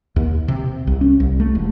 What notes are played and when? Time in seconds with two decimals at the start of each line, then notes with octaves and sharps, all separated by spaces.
0.16 D#2
0.48 C3
0.87 C2
1.01 C#4
1.20 C2
1.40 A3
1.55 E1